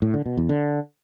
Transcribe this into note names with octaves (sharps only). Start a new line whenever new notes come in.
A2
D3
B2
E2
D3